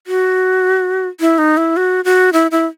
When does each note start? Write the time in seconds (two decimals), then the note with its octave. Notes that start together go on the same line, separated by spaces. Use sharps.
0.07 F#4
1.20 E4
1.38 D#4
1.57 E4
1.77 F#4
2.05 F#4
2.33 E4
2.51 E4